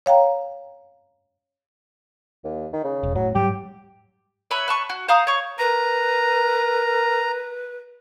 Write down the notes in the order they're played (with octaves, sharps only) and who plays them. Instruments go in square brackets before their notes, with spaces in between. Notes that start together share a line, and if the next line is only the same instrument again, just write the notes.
[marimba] C#5 F5 G5 A#5
[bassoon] D#2
D#3
C#3
[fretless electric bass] E1
[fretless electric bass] A2 [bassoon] F#3
[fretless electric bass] G#2 F#3 G3 [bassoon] G4
[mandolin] B4 C#5 E5 B5
B4 A5 C#6
F#4
C5 F5 A#5 D#6
C#5 C#6
[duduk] A#4 [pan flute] B4 [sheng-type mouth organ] A#5